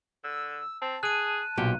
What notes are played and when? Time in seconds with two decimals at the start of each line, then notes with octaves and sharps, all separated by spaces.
0.24 D3 E6
0.81 C4 A5
1.03 G#4 F#6 D#7
1.57 B1 A#2 F#4 G4